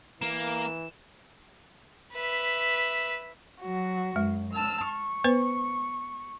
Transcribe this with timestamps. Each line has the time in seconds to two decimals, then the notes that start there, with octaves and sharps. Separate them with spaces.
0.21 E3 A#3 E7
2.14 B4 E5
3.61 F#3 F#4
4.16 F#2 G#3
4.53 A5 E6 F6
4.87 C#6
5.24 B3 B4 C5